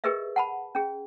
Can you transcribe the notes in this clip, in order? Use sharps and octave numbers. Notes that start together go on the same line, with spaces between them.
G4 G#4 A#4 B4 D#5 E5
F#5 A5 B5
C#4 G#4